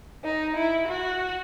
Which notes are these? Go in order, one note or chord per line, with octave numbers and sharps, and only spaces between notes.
D#4
E4
F#4